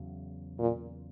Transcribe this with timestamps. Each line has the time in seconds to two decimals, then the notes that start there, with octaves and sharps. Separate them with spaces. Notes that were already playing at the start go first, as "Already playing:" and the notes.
Already playing: E2 C#3 F#3
0.59 A#2